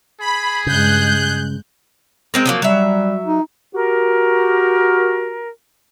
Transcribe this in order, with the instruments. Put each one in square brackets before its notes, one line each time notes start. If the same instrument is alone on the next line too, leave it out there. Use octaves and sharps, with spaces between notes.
[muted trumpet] G#4 [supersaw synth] B5
[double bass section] G2 G#3 [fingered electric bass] C#3 [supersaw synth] F#6 G6
[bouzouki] G#3 C4 A#4
F3 F#3 A#3
[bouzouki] F#3 E5 [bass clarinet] G3
[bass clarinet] D#4
[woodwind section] F#4 G4 A#4